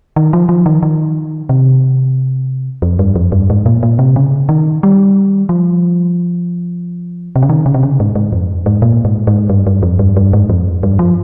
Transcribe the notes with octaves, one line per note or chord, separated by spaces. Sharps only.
D#3
F3
F3
D#3
D#3
C3
F2
G2
F2
G2
G#2
A#2
A#2
C3
C#3
D#3
G3
F3
C3
C#3
D#3
C#3
C3
C#3
G#2
G#2
F2
G#2
A#2
G#2
G#2
G2
G2
F2
G2
G2
G#2
F2
G2
F3